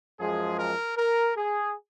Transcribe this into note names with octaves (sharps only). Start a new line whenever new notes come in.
F#2 F3 G#3 G#4
A#4
A#4
G#4